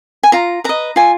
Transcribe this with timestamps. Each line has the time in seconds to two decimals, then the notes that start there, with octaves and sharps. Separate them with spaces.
0.23 G#5
0.32 F4 A#5
0.64 B4 D#5 A#5
0.96 F4 G#5